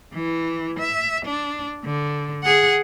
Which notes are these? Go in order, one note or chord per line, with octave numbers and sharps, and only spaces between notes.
E3
E5
D4
D3
G#4 F#5